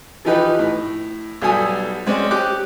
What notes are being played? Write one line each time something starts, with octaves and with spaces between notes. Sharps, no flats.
E3 F3 D#4 G4 B4
A2
B1 F#3 G3 A4 G#5 D#6
G#3 C4 C#4 D5
G4 D6 F#6